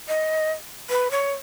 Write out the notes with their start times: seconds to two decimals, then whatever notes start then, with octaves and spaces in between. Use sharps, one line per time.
0.08 D#5
0.90 B4
1.11 C#5